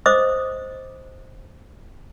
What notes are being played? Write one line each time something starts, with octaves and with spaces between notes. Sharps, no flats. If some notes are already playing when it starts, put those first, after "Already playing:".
C5 D#5 D6 D#6